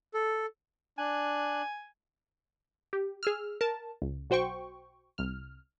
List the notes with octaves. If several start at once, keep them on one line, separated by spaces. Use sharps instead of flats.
A4
D4 G#5 F#6
G4
G#4 E6 F6
A#4 A5
C#2
B1 F#4 C5 G5 C#6
C2 F6